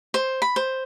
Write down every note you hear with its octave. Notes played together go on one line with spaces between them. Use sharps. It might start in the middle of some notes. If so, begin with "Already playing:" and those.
C5
B5
C5